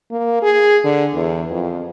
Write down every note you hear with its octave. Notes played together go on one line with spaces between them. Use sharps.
A#3
G#4
D3
E2
F2